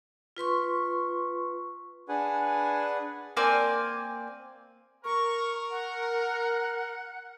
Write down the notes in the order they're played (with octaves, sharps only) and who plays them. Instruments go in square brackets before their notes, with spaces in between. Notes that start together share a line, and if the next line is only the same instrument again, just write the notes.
[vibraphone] F4 B4 C6 C#6
[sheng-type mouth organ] D4 G#4 B4 F#5 G#5
[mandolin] A#3 C4 D5 G#5
[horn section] A#4 [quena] C#6
[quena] F#5